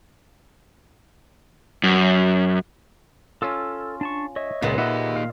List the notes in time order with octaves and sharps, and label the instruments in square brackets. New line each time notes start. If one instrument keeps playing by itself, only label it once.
[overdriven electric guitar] F#2
[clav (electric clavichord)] C#4 F4 [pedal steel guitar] A4 E6
[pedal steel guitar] D4 A5 C#6
C#5 D#5 E5
[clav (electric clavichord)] C#2 [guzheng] A#2 [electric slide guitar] A#3 B3 B4
[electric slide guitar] A#3 D#5 [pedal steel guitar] D#4 G4 G#4 [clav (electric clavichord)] B4 E5 F#5
[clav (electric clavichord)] F5